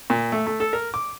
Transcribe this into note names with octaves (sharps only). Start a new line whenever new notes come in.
A#2
A3
A3
A4
A#4
D6